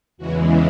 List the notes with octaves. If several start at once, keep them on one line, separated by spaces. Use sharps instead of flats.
E2 C#3 E3 G#3 F#4